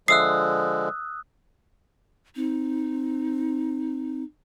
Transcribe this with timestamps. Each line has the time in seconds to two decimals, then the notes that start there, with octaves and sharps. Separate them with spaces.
0.08 D3 F3 G#3 E5 D#6 E6 F#6 C7
2.36 C4 D#4